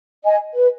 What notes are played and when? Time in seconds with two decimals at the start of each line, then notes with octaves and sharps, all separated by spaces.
0.23 D#5 G#5
0.55 B4